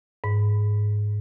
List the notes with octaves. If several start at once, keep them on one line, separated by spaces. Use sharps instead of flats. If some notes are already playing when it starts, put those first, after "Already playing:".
G#2